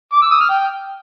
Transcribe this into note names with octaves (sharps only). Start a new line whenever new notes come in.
D6
E6
D#6
F6
G5